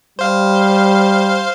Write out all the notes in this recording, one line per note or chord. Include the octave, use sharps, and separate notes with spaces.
G3 C5 F5